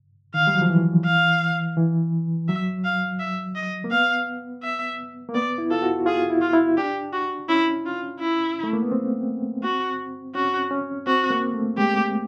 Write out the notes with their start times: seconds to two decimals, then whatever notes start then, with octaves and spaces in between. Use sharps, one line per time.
0.34 D#3 F5
0.47 G3
0.55 F#3
0.62 F3
0.70 E3
1.05 F5
1.77 E3
2.48 F#3 E5
2.84 F5
3.19 E5
3.56 D#5
3.84 A#3
3.91 B3 F5
4.63 E5
5.29 A#3
5.35 B3 D5
5.58 E4
5.70 F4 A4
5.82 F#4
6.06 F4 G#4
6.30 E4
6.41 F4
6.53 E4
6.77 D4 G4
7.13 F#4
7.49 C#4 E4
7.85 F4
8.20 E4
8.64 A3
8.73 A#3
8.82 B3
8.92 C4
9.63 F#4
10.35 C#4 F#4
10.71 C#4
11.07 C4 F#4
11.30 A#3
11.54 A3
11.78 G#3 G4